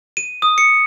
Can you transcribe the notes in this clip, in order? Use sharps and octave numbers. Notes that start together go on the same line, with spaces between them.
D#7
D#6
C#7